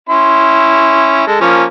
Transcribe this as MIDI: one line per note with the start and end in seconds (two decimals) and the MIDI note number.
0.09 1.26 61
0.09 1.26 64
0.09 1.26 84
1.27 1.36 56
1.27 1.36 69
1.41 1.63 53
1.41 1.63 58
1.41 1.63 61